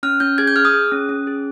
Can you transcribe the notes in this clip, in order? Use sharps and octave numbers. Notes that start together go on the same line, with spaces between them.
C#4 F6
C#4 G6
G#4 G#6
G6
G#4 F6
D#6
G#4
C#4
C#4
G#4